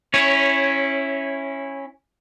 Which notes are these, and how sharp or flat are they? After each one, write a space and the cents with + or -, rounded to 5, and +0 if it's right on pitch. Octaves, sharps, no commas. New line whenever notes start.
C#4 -15 E4 +0 C#5 +5